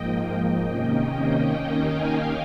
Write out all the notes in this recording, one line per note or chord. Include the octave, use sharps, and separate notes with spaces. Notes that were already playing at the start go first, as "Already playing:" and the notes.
Already playing: G#2 F3 A#3 D#5 G5
D#5 G5
C3 D#3 A#3 C#4 D#5 G5
D#2 D#3 A#3 C#4 D#5 G5
F5 G#5